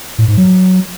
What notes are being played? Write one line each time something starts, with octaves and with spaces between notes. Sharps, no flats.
A2
G#2
F#3